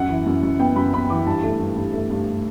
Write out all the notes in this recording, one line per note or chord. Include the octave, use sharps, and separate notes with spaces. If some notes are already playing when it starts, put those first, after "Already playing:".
Already playing: F#2 F#5
E3
F#2
F#2
B3 G5
F#2 B5
B3 B5
E3 D6
G2 A5
A3
G2
G2
A3
G2